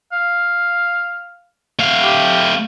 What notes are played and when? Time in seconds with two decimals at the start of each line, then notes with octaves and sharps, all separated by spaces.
0.12 F5
1.79 A3 F5
2.02 G4